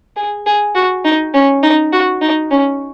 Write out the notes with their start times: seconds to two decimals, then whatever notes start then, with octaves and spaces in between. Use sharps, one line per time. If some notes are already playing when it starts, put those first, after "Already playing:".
0.17 G#4
0.46 G#4
0.75 F#4
1.05 D#4
1.34 C#4
1.63 D#4
1.92 F#4
2.22 D#4
2.51 C#4